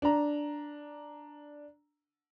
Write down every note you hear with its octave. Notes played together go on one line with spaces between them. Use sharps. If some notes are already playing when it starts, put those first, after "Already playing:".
D4 A#5